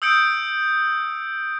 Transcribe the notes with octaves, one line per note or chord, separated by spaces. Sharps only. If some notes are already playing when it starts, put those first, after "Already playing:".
D#6 E6 G6 C#7 D7